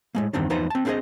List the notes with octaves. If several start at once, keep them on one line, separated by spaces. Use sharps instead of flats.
A2 G#3 A#3
E2 G2 D#3 C4 D4
E2 F3 D#4 B4 C5 A#5
C4 A5
C4 D4 G#4 B4 C5 D#5